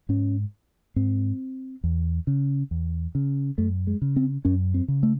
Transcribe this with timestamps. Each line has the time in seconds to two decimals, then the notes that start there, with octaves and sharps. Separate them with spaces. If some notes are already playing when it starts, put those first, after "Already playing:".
0.09 G#2 C#4
0.96 G#2 C4
1.84 E2
2.27 C#3
2.71 E2
3.15 C#3
3.58 F#2 A3
3.87 G#3
4.02 C#3
4.16 C4
4.45 F#2 C#4
4.74 C4
4.88 C#3
5.03 A3